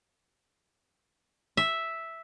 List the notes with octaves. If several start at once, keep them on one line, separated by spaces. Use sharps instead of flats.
E5